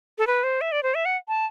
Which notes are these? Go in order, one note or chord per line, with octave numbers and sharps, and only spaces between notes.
A4
B4
C5
E5
D5
C5
E5
F#5
A5